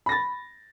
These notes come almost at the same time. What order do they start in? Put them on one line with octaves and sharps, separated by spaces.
B5 A#6 A6